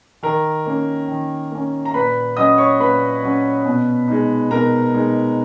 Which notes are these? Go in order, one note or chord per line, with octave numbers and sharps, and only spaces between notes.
D#3 A#4 A#5
A#3 C#4
D#3
A#3 C#4
A#5
A#2 B4 B5
F#3 C#4 D#5 D#6
C#5 C#6
A#2 B4 B5
F#3 C#4
B2
G#3 D#4
B2 A#4 A#5
G#3 D#4